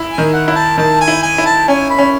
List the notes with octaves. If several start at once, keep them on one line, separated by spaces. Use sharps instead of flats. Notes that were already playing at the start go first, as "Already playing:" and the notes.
Already playing: E4
G#5
D#3
F#5
E4
A5
D#3 A5
G#5
E4
G#5
E4
A5
C#4 G#5
B5
C#4